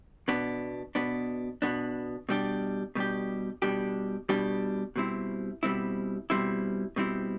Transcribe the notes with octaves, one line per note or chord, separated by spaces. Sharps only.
B2 B3 D4
B2 B3 D4
B2 B3 D4
B2 G3 D4 G4
B2 G3 D4 G4
B2 G3 D4 G4
B2 G3 D4 G4
B2 G3 C4 E4
B2 G3 C4 E4
B2 G3 C4 E4
B2 G3 C4 E4